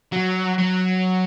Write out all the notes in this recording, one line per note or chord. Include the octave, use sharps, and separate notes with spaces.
F#3
F#3